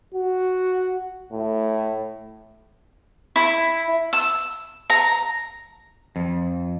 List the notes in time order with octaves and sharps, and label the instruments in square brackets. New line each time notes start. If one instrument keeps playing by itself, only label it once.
[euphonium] F#4
A2
[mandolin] E4
E6
A#5
[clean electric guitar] F2